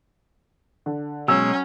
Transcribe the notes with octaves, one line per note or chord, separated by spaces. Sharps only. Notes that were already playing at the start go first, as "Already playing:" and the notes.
D3
B2 F#3 G#3 C#4 E6